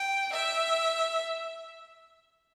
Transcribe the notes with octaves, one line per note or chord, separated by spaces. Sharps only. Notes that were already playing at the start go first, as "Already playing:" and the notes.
Already playing: G5
E5